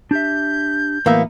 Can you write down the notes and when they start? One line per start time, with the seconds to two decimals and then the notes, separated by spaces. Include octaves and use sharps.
0.11 D4 G4 E5 G6
1.06 A2 E3 F#3 A#3 B3 E5